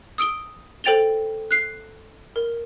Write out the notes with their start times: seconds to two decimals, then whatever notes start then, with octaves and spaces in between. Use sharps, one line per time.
0.18 D#6 E6 D7 G7
0.84 A4 C5 G5 A6 F7 G7
1.51 F#6 C7
2.36 A#4